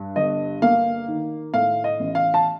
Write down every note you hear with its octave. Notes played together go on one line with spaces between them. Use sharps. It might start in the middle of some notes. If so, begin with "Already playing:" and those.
Already playing: G2
G1 D#5
A#3 F5
D#3
A2 F5
D#5
A1
F5
A5